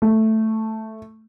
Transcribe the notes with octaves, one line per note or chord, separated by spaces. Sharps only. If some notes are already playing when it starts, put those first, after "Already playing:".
A3